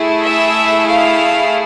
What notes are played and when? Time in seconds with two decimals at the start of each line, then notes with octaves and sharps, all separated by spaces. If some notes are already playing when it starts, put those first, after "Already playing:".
Already playing: A3 E4 G#4
0.24 E5
0.87 F5